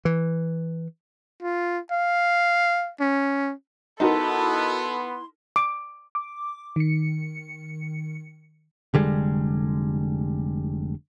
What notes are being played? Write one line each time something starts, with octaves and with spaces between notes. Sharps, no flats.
E3
F4
F5
C#4
B3 D#4 E4 F#4 A4 A#4 C6
D6
D6
D#3 C#7
F1 D3 G3 G#3